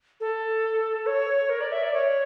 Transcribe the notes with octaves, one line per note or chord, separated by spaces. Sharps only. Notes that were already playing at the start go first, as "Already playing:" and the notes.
A4
C#5
A#4
D5
E5
D5
C#5